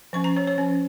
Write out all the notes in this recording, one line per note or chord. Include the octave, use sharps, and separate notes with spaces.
F3 C#4 C#6
A#5
C#5
C#5
F3 C#4